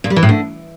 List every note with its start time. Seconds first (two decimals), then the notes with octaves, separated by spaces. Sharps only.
0.04 A#2
0.10 G3
0.16 E3
0.23 A2
0.29 D3